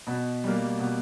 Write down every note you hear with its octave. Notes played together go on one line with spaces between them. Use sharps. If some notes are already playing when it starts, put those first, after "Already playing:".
B2
G3 A#3
B2